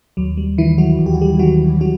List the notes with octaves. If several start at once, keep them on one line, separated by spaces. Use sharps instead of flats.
D#2 F#3
G3
D#3 E3 E4
F#3 F#4
D#2
G4
F#4
G3 G4
D#3 F#3 F#4
F#3 F#4